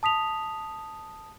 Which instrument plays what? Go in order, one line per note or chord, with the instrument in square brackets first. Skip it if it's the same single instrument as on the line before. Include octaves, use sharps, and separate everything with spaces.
[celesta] A5 D#6 B6 F7